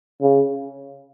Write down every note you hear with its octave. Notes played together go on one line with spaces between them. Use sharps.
C#3